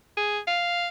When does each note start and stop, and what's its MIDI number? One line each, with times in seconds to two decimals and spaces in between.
0.17 0.39 68
0.47 0.88 77